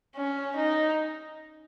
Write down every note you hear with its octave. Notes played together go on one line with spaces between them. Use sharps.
C#4
D#4